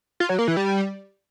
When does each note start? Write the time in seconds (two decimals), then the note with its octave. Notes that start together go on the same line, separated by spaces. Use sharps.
0.20 F4
0.29 F#3
0.39 A#3
0.48 E3
0.57 G3